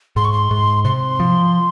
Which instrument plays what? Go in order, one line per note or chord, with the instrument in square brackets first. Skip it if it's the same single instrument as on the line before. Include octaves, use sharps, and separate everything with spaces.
[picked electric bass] G#2 [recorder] C6
[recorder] C#6
C6
[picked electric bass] G#2
[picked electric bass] C3 [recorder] C6
[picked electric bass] F3